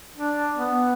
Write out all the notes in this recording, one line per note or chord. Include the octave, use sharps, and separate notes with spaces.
D4
B3